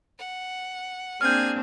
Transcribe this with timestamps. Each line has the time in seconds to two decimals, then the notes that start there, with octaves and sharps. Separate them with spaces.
0.19 F#5
1.21 A#3 C4 D4 G#4 F6 G6 G#6